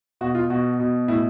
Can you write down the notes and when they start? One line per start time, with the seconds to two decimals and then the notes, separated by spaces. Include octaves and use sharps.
0.21 B2 F#4
0.35 F4
0.50 B2 F#4
0.80 B2
1.08 A2 E4